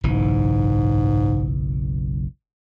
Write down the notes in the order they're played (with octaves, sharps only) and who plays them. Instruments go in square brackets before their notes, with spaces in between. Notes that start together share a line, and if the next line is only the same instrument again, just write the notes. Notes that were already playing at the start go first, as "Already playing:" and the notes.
[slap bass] F#1 B1 E3 [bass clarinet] G#2